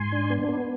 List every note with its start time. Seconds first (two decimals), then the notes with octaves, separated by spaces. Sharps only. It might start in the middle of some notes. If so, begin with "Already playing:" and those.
Already playing: G#2 G#5 C6
0.12 D4
0.30 B3
0.48 B3